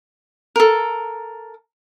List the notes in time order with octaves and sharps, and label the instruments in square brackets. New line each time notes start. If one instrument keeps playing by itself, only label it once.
[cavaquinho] A4 A#4